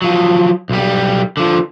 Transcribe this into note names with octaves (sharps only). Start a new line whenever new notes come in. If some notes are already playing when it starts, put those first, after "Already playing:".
F3 F#3
B1 G3
D3 F3